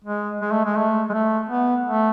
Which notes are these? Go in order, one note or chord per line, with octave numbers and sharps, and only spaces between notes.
G#3
G#3
A3
G#3
A3
G#3
A3
B3
A3